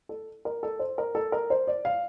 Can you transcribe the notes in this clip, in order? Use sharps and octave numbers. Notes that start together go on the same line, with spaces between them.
A4
A#4
A4
C5
A#4
A4
A#4
C5
D5
F5